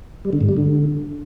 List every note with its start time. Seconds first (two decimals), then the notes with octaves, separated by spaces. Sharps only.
0.25 G3
0.33 D3
0.41 G#2
0.49 G3
0.57 D3